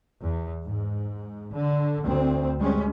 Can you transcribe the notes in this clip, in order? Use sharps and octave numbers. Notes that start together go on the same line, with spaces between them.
E2
G#2
D3
D2 C4
G3 G#3 C#4